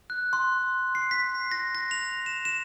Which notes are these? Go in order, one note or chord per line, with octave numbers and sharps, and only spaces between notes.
F#6
C6
C7
B6
A#6
A#6
F7
E7
E7